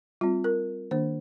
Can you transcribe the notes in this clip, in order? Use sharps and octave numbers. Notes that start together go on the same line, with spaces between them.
G3 C4 F4
A#4
D#3 A#3 D4 C5